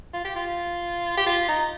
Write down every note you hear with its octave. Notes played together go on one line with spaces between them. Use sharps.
F4
G4
F4
G4
F4
D#4